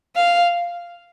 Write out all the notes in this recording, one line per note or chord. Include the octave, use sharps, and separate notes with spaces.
F5